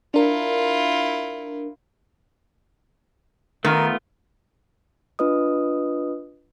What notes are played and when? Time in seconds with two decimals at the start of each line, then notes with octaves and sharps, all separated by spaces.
0.14 D4 E4 F4 A#4
3.65 D#3 A3 B3 F4 A#4
5.19 D4 F4 B4 D#5 D#6